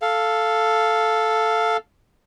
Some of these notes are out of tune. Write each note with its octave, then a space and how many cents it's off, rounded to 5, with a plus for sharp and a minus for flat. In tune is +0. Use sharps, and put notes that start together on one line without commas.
A4 +0 F5 +0